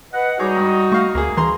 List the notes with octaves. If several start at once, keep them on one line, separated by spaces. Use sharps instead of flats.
B4 D#5 F#5
G3 D#4 F#4 G#4 C#5 D6
G2
A3 F5 C#6
D2 A#3 G#4
E3 G#4 A#5 C6